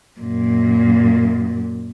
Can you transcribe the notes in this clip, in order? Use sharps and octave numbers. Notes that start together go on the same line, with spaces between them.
F#2 A#2